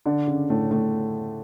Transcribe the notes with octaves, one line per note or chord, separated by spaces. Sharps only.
D3 D4
C#3 C#4
A2 A3
A2 A3